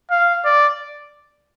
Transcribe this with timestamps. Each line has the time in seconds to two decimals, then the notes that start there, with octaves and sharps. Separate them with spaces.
0.11 F5
0.45 D5